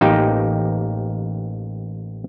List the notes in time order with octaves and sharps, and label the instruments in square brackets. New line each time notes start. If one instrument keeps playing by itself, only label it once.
[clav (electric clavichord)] A1 A#3 D#4 G4 G5